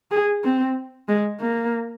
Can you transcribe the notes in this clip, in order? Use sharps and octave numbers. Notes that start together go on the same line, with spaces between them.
G#4
C4
G#3
A#3